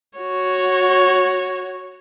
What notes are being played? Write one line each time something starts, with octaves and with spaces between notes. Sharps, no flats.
F#4 C#5